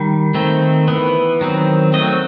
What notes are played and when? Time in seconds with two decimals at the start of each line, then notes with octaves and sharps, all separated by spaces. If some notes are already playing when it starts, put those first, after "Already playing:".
Already playing: D#3 G3
0.34 D#3 A3 C4
0.88 E3 B3
1.41 D#3 F#3 C4
1.93 F#3 A3 C4 D#5